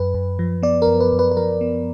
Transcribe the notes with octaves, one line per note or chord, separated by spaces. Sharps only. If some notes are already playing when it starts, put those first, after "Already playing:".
Already playing: F#2 B4
F#2
F3
B3 D5
A#4
F#2
B4
F#2
B4
B4
F3 A#4
B3